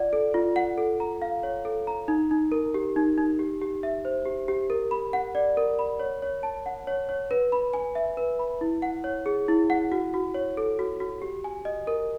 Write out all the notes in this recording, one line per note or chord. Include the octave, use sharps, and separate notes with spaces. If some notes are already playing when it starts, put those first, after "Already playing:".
Already playing: F4 D5 F#5
A4
F4
F#5
A4
A#5
F5
C#5
A4
A#5
D#4
D#4
A#4
G4
D#4
D#4
G4
G4
E5
C5
G4
G4
A#4
B5
F#5
D5
A#4
B5
C#5
C#5
A5
F#5
C#5
C#5
B4
B5
G#5
E5
B4
B5
E4
F#5
C#5
G#4
E4
F#5
F#4
F#4
C#5
A4
F#4
F#4
G4
G#5
D#5
A#4